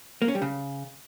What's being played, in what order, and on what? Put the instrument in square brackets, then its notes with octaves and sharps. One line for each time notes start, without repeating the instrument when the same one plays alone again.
[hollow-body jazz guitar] A#3
C#4
G3
C#3